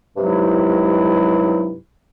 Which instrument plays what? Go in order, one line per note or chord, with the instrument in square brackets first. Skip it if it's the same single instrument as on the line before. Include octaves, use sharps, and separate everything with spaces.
[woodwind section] G2 C3 F#3 G#3 D#4 E4